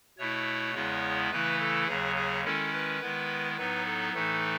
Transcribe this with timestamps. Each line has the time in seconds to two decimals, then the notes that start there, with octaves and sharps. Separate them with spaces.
0.18 B2 A3 E4 C#5
0.75 E2 C#3 G#3 B3 E4
1.31 C#3 E3 A3 E4 B4
1.60 A4
1.88 D#2 C#3 F#3 G#4
2.16 G#4
2.44 D#3 G#3 C#4 E4 A4
2.73 B4
3.01 D#3 G#3 B3 E4
3.57 A2 F#3 B3 D#4 B4
3.85 A4
4.14 A2 E3 A3 D#4 A4